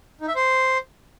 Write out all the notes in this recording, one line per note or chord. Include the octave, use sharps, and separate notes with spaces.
D#4
E5
C5